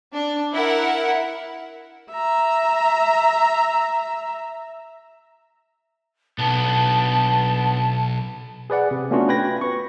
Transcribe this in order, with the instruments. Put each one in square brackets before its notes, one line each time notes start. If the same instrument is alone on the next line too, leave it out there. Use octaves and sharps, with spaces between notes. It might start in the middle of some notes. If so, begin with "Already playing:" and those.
[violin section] D4
E4 A#4 F#5
[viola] E5 A#5
[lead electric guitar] B1 [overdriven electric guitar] B3 D4 [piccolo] A5
[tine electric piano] G#4 B4 D5 F#5
C3
A3 B3 C#4 D4 F4 F#4
B4 G5 B5 G#6 A#6
B4 C#6